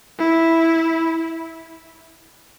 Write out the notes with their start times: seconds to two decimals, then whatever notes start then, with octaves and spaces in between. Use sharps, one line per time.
0.19 E4